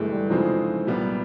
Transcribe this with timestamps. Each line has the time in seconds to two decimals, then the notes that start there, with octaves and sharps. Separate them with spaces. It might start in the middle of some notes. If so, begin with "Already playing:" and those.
Already playing: G1 G2 E3 G#3 A3
0.11 G3
0.30 C#3 E3 F3 G#3 C4 D#4
0.87 C2 A#2 F#3 G3 B3